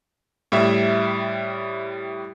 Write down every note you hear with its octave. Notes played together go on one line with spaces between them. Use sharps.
A2 G3 E5